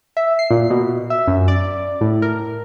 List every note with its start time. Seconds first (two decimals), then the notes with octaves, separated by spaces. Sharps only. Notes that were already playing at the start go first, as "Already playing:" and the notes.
0.17 E5
0.39 C7
0.51 A#2
0.70 B2
1.10 E5
1.27 F#2
1.48 D5
2.01 A2
2.22 A#4